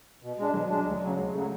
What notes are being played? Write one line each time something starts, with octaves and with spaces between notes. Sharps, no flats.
B2
G#3 D4
B2 F#3
G#3 D4
D2
C#3 F#3
D2 G#3
C#3 F#3 A3